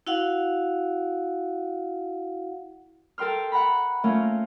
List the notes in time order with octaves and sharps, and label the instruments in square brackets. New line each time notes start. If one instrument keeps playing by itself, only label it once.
[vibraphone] E4 F#4 F5 F#5
[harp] A4 A#4 G5 C6 F6
F#5 A#5 B5
A3 A#3 C#4 F4 A#4